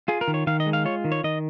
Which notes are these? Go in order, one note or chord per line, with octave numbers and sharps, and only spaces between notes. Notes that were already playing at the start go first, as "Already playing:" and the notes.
F4 G#4
A#4
D#3
C#5
D#3 F5
D#5
G#3
F5
F4 C#5
D#3
C#5
D#3 D#5